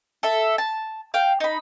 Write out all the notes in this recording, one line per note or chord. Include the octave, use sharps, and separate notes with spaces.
A4 E5
A5
F5 G5
D#4 B5